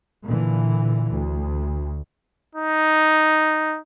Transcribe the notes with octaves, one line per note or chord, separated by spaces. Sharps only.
A#2 D3 E3
D2
D#4